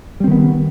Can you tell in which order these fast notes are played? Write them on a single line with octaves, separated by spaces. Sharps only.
G3 C4 D#3 B3